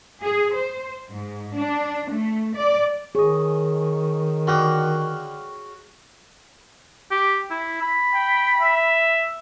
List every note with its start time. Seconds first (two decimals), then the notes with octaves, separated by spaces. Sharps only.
0.22 G#4
0.54 C5
1.10 G#2
1.55 D4
2.11 A3
2.56 D5
3.15 D#3 G#4 C#5 D#5
4.47 D3 F#4 G4 F5 D#6
7.11 G4
7.50 E4
7.81 B5
8.14 G5
8.60 E5